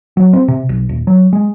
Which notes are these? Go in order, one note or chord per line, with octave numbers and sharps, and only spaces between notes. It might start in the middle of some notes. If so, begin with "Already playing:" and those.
F#3
C4
C3
B1
D#1
F#3
G#3